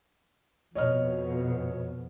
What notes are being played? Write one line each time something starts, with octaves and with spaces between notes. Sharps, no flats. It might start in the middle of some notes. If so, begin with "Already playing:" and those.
F2 B2 C#5 D#5 F6